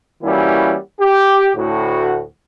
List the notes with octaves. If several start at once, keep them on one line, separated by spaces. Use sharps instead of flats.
E3 G3 A#3 C#4 E4 F#4
G4
D2 A2 F#4